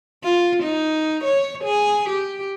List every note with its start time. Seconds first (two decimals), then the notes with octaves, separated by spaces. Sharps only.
0.24 F4
0.63 D#4
1.24 C#5
1.64 G#4
2.09 G4